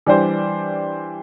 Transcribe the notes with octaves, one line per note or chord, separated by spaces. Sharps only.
E3 G3 D4 G4 C5